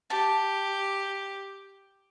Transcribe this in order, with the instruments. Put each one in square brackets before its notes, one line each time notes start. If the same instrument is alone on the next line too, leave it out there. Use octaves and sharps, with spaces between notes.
[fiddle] G4 [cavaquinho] A5